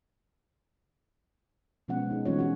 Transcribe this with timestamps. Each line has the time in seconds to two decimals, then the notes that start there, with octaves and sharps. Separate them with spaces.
1.88 B2 F3 G#3 B3 C#4 F#5
2.10 D#4 G#4
2.25 E3 G3 C4 C#4 F4 C#5
2.38 C#4 F#4 G4 C#5 F#5